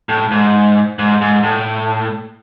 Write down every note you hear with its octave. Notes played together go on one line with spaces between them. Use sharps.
A2
G#2
G#2
G#2
A2